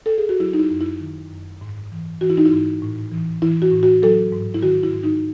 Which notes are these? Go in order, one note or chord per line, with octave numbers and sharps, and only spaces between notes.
A4
G#4
F#4
F#3 E4
D#4
E4
F#2
E4
D#3
F#2
G#2
E3
E3 F#4
E4
D#4
E4
G#2
A2
E3
E3 E4
F#4
A2
F#4
F#3 A4
G#2
E4
D#3 F#4
E4
G#2
D#4